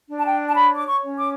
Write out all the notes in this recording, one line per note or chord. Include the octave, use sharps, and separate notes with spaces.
D4
A5
G5
A5
C#5 B5
D6
C#6
C#4
D6